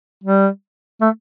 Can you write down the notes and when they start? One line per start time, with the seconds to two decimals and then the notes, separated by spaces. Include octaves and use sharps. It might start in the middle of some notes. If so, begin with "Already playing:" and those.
0.24 G3
1.01 A3